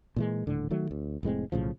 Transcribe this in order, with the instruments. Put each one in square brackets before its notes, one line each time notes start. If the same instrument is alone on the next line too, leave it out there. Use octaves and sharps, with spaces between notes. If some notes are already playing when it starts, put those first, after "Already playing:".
[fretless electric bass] A#2 E3 G#3
D#1 A2 D3
D#3 F#3 A3
D2
F1 A2 G#3 C4
B1 A2 C#3 F3